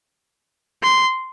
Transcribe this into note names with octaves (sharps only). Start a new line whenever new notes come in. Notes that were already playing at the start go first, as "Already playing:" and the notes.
C6